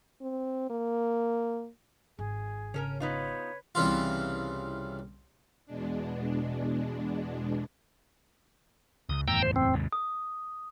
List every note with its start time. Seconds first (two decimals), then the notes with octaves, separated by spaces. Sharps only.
0.21 C4
0.70 A#3
2.19 G#1 G#4
2.74 C#3 C#4 A4 A#4
3.00 B3 D#4 F4 B4 C#5
3.75 C2 C#3 E3 F4
5.66 E2 B2 G#3 D4
9.09 C#2 D#6
9.28 F#1 E2 A2 G5 A#5 E6
9.42 C5
9.56 C4
9.74 D#2 G#2 C3
9.93 D#6